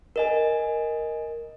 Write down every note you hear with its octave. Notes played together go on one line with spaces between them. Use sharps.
A#4 D#5 G#5